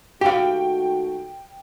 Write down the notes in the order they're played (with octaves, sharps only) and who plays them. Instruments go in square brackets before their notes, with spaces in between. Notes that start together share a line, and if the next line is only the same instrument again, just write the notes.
[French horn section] D#2 A3 F#4 [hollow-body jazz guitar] G4 F5 [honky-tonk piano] G5